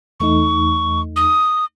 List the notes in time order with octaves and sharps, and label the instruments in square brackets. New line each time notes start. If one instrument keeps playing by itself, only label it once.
[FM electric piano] E2 A3 D#4 [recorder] C#6
[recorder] D#6